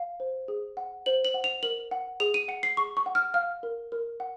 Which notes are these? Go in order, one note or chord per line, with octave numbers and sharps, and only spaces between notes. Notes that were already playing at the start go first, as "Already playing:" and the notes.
Already playing: F5
C5
G#4
F#5
C5 F#7
F#7
F#5
F7
A#4 F#7
F#5
G#4 F7
D#7
F#5 C#7
C7
G#4 C#6
C#6
F#5
F6
F5 F6
A#4
A#4
F#5